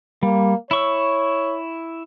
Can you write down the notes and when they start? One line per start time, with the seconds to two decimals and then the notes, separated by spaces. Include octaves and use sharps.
0.23 G3 A#3
0.71 E4 C#5 C#6 E6